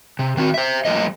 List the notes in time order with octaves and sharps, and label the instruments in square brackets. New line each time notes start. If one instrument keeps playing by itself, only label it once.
[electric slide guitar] C3
D#3 C4 F#4
C5 E5
F3 G3 A3 A#3 D#5